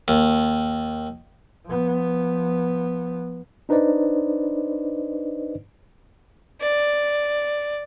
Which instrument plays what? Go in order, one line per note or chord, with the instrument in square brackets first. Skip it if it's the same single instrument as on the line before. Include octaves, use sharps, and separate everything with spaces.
[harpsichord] D#2
[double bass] F3 B3
[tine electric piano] D4 D#4 B4 C5 D5 D#5
[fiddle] D5